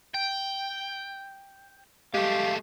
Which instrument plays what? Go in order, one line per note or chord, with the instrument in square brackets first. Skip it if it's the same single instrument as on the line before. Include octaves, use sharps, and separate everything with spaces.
[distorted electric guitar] G5
[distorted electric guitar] G#3 A3 [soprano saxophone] G4 [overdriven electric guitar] F5